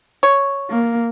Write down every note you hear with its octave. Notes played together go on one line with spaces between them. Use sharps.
C#5
A#3